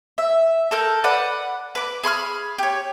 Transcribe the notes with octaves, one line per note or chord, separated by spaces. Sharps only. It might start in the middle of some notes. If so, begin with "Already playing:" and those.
E5
A4 A#4 G6
B4 D5 F#5 B5
B4 D6
G#4 B5 C6 F6
G4 C#5